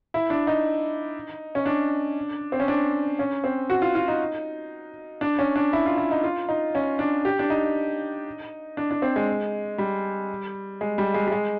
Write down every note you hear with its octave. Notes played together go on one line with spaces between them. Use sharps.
E4
D4
D#4
C#4
D4
C4
C#4
D4
C#4
C4
F#4
F4
F4
D#4
D4
C#4
D4
E4
F4
E4
D#4
F4
D#4
C#4
D4
G4
D4
D#4
D4
D4
C4
G#3
G3
G#3
G3
G#3
G3
G#3